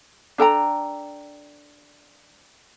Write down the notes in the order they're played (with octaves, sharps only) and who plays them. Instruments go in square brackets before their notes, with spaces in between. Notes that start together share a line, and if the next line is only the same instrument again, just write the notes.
[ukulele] D4 A4 G5 A#5